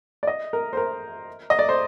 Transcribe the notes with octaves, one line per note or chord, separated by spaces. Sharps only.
D5
D#5
A#4
C5
A#4
D#5
D5
C5